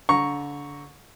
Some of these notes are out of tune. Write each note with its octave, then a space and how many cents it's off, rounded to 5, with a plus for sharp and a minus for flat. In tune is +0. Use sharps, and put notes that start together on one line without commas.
D3 -30 A#5 +0 C#6 +0